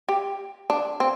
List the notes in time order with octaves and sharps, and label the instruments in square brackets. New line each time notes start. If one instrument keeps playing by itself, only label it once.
[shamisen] G4
D4
C4